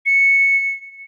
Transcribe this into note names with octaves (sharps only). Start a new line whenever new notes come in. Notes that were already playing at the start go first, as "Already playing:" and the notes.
C#7